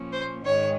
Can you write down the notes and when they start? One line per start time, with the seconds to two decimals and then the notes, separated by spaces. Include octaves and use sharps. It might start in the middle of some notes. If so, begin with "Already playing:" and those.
Already playing: A#2 F3 A#3 C#4
0.12 C5
0.44 G#2 D#3 G#3 C#5